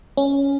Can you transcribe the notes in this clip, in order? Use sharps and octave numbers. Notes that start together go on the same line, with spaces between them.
C#4